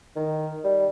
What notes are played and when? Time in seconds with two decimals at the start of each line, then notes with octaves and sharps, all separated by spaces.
0.16 D#3
0.64 G3